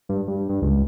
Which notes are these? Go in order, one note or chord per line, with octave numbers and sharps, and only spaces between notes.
G2
G2
G2
C#2